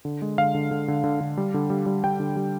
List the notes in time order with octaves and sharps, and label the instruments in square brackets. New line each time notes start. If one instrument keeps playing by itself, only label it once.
[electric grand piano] D3
G#3
D3 F5
D3
D3
D3
D3
D3
G3
D3
G3
G3
G3 G5
D3
G3